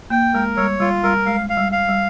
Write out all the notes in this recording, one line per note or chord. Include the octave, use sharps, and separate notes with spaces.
A#3 G5
G#3 A#4
G3 C#5
G3 F4
G3 A#4
G#3 F5
F5
G3
F5
G3